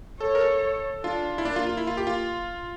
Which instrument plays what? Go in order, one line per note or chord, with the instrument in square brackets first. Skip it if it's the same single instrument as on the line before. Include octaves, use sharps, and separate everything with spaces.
[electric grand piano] A4 [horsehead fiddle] C#5
[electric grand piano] A#4
A4
[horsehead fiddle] D4 [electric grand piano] F4
[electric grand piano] E4
[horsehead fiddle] A#3 [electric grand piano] D4
[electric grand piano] F4
F4
E4
F4
G4
F4